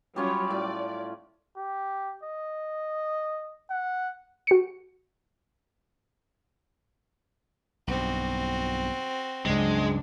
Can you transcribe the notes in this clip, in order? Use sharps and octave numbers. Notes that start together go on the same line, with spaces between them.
F#3 G3 C#4 F4 C#5
A2 D5
G4
D#5
F#5
F#4 C#7
B1 G2 C4 F#4
C#2 G2 C#3 F#3 G#3 D4